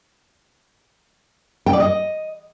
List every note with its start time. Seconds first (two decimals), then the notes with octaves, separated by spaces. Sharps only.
1.66 G5
1.73 D5
1.80 D#5